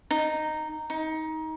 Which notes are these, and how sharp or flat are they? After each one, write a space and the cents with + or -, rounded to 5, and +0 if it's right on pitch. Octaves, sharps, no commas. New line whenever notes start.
D#4 -10
D#4 +20